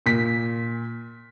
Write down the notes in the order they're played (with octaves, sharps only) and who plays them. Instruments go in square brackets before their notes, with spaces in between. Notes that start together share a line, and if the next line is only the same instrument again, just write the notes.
[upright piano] A#2 B6